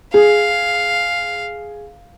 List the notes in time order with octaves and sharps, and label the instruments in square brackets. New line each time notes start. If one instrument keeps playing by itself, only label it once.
[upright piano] G#4 [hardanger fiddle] F5